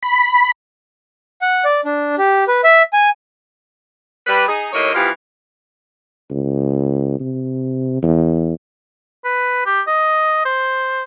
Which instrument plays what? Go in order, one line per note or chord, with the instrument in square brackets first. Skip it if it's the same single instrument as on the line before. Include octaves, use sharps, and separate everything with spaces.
[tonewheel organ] B5
[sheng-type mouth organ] F#5
D5
D4
G4
B4
E5
G#5
[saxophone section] G3 B4
D#4 G#4
D#2 A2 A#3 C#5 D#5
E3 F3 B3 F4 G4
[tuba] C#2
C3
E2
[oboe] B4
G4
D#5
C5